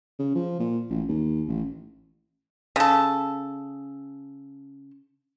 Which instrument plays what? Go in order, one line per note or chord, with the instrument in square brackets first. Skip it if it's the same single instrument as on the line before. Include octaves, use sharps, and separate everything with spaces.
[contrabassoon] C#3
F3
A#2
A1
D#2
A1
[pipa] C#3 A4